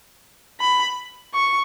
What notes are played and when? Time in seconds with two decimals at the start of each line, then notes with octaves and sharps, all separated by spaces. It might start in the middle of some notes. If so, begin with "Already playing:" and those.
0.60 B5
1.34 C#6